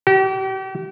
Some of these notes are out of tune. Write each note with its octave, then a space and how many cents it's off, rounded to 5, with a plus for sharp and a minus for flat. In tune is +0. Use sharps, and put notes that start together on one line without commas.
G4 -40